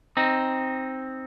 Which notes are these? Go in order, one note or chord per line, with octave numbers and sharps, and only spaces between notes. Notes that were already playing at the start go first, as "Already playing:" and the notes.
C4 D#4